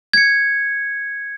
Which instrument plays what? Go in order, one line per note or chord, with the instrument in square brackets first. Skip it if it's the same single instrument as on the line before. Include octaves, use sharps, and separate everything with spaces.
[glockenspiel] G#6 C#7